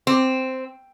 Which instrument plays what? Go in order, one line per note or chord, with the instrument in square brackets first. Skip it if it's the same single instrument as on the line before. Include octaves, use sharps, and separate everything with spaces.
[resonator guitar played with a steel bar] C4